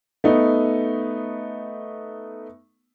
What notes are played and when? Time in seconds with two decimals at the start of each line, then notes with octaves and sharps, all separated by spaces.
0.24 A3 B3 D#4